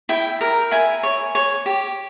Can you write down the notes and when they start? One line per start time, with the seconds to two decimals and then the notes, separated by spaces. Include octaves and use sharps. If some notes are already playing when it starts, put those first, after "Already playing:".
0.09 E4 G5
0.41 A#4
0.71 E4 G#5
1.03 C#5
1.35 C#5
1.66 G4